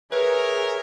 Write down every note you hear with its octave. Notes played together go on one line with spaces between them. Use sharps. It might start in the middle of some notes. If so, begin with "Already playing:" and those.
G#4 A#4 B4 C#5 E5